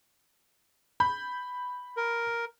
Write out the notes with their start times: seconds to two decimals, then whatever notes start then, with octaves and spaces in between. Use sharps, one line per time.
1.00 B5 G6
1.97 A#4